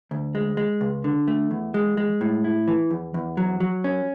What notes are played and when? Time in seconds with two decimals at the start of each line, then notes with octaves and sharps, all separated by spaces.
0.11 D2
0.35 G#3
0.57 G#3
0.81 C#2
1.04 D3
1.28 A3
1.51 E2
1.74 G#3
1.97 G#3
2.21 A2
2.44 E4
2.68 E3
2.90 E2
3.14 E2
3.37 F#3
3.60 F#3
3.84 C#4